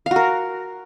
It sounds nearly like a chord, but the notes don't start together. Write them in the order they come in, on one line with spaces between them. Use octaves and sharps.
F5 F#4 A#4